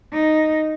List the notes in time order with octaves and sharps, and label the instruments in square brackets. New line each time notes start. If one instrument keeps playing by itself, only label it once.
[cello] D#4